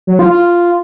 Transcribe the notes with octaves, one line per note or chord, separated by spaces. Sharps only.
F#3
F4
F4